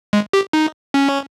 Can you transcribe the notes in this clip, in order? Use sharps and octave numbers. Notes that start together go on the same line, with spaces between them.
G#3
G4
D#4
C#4